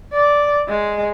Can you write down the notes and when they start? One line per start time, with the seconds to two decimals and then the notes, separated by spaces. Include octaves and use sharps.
0.13 D5
0.68 G#3